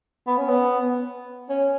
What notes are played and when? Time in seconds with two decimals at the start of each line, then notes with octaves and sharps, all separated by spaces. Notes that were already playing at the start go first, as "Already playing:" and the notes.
0.27 B3
0.37 C#4
0.48 B3
1.50 C#4